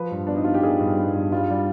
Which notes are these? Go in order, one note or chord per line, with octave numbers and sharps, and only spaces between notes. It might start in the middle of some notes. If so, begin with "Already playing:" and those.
Already playing: F3 B4
G2
B3 D4
D#4
B3 F4
G4
B3 G#4
G2
B3
G2
G3 F4
G3